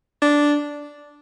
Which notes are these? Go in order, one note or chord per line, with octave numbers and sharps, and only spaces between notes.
D4